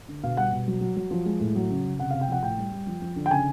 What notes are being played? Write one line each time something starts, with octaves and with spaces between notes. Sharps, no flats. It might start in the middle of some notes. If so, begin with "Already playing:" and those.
D3
B2 F5
G3 F#5
B2
F#3
F#3
F#3
F3
G#3
A2
F#3
C#3
C#3
C3 F#5
C3 F5
G5
F3 F#5
A2 G5
G3
G3
F3
F3
D3
G5
C#3 G#5